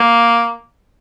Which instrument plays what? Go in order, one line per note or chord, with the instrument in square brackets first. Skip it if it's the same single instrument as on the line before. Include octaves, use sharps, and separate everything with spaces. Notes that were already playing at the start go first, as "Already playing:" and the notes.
Already playing: [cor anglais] A#3